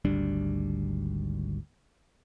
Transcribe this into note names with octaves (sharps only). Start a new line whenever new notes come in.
G#1 D2 G3 D4